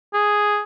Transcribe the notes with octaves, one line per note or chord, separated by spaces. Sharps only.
G#4